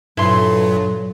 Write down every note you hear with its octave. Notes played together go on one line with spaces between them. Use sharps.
G2 A#2 F#3 E4 A4 B4 C6